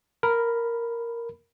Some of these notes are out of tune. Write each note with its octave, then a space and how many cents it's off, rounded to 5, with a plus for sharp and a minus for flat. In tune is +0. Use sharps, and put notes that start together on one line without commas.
A#4 +0 B5 +0